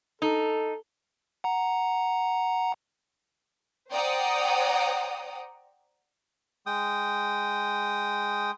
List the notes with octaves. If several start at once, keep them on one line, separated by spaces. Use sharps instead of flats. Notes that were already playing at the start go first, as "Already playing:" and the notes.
D#4 A4
F#5 A#5
C5 D5 F#5 G5 A#5 D#6
G#3 G5 D#6